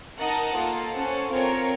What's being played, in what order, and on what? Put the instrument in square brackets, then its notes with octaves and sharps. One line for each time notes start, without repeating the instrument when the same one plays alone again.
[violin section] D#4 A#4 D#5 F#5 A5
A#3 F4 A4
C#4 A4 C5 F#5
C4 F4 A#4 C#5